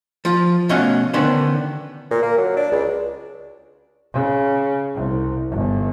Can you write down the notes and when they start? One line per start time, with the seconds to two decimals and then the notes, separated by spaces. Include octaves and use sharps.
0.25 F3 F4
0.69 B2 A3 C#4 D#5 F5 F#5
1.13 D3 D#3 B3 C#4 D4 C5
2.11 A#2
2.23 A#3
2.38 F#3
2.56 D4
2.72 C#2
4.13 C#3
4.95 C2
5.51 G1